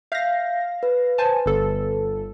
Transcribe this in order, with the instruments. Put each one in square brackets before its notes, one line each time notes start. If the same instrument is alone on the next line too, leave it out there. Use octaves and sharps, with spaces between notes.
[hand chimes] E5 G6 B6 [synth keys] F5 A#6
[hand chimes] B4
[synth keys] C5 G#5 A5
G1 A4